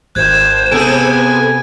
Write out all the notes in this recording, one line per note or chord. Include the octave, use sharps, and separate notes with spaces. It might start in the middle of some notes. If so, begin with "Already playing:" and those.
G#1 C5 F#6 G#6
C3 B3 G#4 A4 G#5 D7